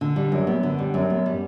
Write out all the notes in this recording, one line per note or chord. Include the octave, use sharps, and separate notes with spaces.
D3
G3
F#2
B3
D3
G3
F#2
B3
G3